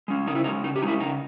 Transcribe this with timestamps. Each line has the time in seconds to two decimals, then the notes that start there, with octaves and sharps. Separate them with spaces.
0.08 G#3 C#4
0.27 C#3 D#4
0.35 E4
0.44 G#3 C#4 D#4
0.63 C#3 D#4
0.76 G4
0.82 G#3 D#4
0.86 C#4 E4
1.00 C#3 D#4